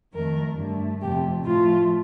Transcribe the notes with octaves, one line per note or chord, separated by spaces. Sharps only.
F2 D#3 A3 A#4
G2 D3 A3
F2 C3 F3 A3 G4
A2 F3 A3 F4